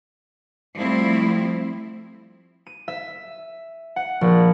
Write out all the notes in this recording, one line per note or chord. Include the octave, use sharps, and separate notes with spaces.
F3 G3 A3 C4 E4
D#7
E5
F#5
A#1